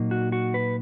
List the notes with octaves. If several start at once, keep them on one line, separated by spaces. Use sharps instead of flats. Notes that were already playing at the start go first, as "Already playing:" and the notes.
Already playing: A#2 F#3 A#3 D#4
F#4
F#4
B4